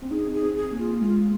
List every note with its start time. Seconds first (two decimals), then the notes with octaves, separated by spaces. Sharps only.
0.02 C4
0.11 D#4 G#4
0.33 G#4
0.41 C4
0.56 G#4
0.71 A#3
0.78 F4
1.01 G#3 F4